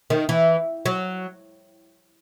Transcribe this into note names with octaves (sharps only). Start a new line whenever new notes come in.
D#3
E3
F#3